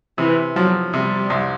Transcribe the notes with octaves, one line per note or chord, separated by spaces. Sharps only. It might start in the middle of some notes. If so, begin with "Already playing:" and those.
C3 E3
F3 F#3
C3 G3
C2